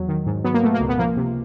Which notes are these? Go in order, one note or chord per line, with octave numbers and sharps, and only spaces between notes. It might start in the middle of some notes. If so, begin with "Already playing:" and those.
Already playing: E2 F#3
D#3
G#2
F#3 B3
A#3
B2 A3
A#3
C#2
B3
F3 A#3
C3